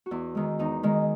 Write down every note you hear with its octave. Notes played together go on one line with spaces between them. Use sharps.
F#4
E2 E4
D#3 G#3
E2 D#4
D#3 G#3